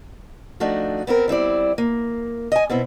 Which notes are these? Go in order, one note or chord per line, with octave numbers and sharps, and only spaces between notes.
F3 A3 D4 D#4 F#4
B3 C4 E4 A#4
G3 C4 E4 D5
A#3
D#5 G#5
B2 B3 C4 E4